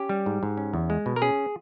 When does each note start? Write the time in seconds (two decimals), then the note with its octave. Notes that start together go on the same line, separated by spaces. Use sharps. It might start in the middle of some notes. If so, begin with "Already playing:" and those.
Already playing: C#4 G4
0.09 G3
0.26 G#2
0.43 G#2
0.57 C#4
0.74 E2
0.90 G#3
1.06 B2
1.16 A#4
1.22 C#4 G#4